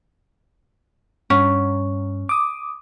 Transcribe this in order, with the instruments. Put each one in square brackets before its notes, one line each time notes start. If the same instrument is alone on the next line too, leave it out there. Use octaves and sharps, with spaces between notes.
[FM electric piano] G2 [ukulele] C#4
[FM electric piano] D6 D#6